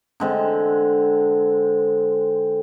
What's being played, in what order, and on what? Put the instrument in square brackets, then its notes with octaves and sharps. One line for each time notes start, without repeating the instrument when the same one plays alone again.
[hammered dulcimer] D3 G#3 C4